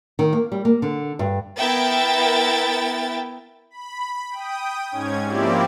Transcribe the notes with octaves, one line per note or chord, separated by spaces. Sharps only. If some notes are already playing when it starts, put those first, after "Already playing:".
D#3
A#3
G3
A#3
D3
G2
B3 E4 A#4 E5 G5 A6
B5
G5 D#6
G#2 C#4 G#6
F3 A#3 C4 E4 G4 D5